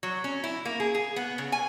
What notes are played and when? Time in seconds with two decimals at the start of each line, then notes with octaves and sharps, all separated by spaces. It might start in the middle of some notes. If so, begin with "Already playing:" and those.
0.03 F#3
0.24 C#4
0.44 E4
0.65 A#3
0.80 G#4
0.95 G#4
1.16 B3
1.38 C#3
1.52 G#5